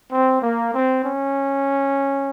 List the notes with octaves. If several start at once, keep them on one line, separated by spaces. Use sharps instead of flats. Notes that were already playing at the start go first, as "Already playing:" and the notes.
C4
A#3
C4
C#4